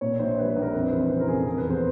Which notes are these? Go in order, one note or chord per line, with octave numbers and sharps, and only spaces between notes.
A#2 C#5
A#1 C5
G3 B4
B4
A#1
A#4
F2 B4
C5
E3
B4
C#3 C5
A#4
F1 G#4
A4
C3 A#4
B4
E2
C5